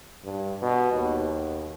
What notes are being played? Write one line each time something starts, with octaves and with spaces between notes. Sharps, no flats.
G2
B2
D#2